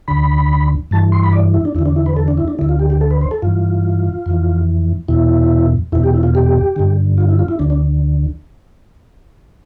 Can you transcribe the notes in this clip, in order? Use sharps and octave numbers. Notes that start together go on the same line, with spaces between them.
D2 D3 B5
G2 E3 A5
C6
B5
D5
E4
D4
E2 D3 E4
D4
E4
B4
A4
D4
E4
D4
D2 D3 E4
F4
G4
G4
A4
B4
C5
A4
G2 E3 F4
F2 E3
E2 B2 E4
E2 B2 E4
G4
E4
F4
G4
G2 D3
F4
E4
F4
E4
D2 D3 D4
D4